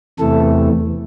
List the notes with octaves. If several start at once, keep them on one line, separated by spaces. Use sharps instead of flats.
E2 C3 E3 A3 A4